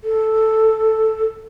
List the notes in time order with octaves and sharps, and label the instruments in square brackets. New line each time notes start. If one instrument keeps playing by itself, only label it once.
[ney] A4